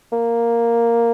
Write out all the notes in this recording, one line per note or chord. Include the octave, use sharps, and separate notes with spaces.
A#3